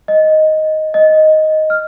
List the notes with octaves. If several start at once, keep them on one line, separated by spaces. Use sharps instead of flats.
D#5
D#5
F6